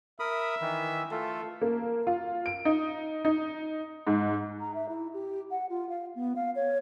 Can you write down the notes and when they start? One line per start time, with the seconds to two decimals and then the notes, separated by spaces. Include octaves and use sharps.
0.20 A#4 E5 B5 D#6
0.61 D#3 E3
1.11 A3 F4 A4
1.62 A#3
2.07 F4
2.46 D7
2.65 D#4
3.25 D#4
4.07 G#2
4.60 A#5
4.74 E5
4.89 E4
5.14 G4
5.51 F#5
5.69 F4
5.89 F5
6.15 B3
6.36 F5
6.55 C#5